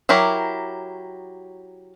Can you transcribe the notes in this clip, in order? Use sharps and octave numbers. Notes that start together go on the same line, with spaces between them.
F#3 E4 G4 A#4 C#5